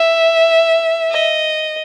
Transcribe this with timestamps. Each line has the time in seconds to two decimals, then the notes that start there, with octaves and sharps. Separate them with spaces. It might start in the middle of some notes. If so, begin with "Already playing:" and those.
Already playing: E5
1.11 D#5